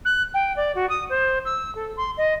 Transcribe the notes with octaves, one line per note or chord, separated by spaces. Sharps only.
F#6
G5
D5
F#4
D#6
C5
E6
A4
C6
D#5